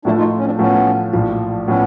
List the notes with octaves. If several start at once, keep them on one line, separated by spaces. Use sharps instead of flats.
A2 F3 A3 D4 E4
D#4 F4
C#4
C4 D4
A2 F3 A3 B3 C#4
A#1 A2 F3
A2 F3 B3 C#4